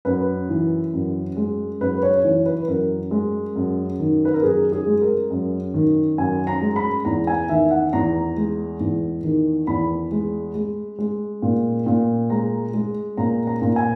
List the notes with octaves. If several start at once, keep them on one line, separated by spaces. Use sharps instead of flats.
F#2 B4
E3
F#2
G#3
F#2 B4
C#5
E3 C#5
B4
F#2 A#4
G#3
F#2
D#3
B4
A#4
F#2 G#4
G#4
G#3
A#4
F#2
D#3
F#2 G#5
A#5
G#3
B5
E2 A#5
G#5
D#3 E5
F#5
E2 A#5
G#3
E2
D#3
E2 B5
G#3
G#3
G#3
A#2
A#2
G#3 A#5
G#3
A#2 A#5
A#5
A#2
G#5